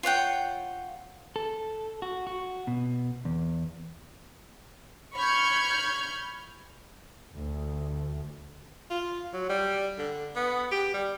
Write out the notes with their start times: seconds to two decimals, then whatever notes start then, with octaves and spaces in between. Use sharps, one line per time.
0.03 F4 C#5 F#5 G5
1.36 A4
2.02 F#4
2.27 F#4
2.67 B2
3.25 E2
5.15 B5 C#6 F6 G6 G#6
7.33 D2
8.90 F4
9.33 F#3
9.49 G3
9.98 D3
10.36 B3
10.72 G4
10.94 G3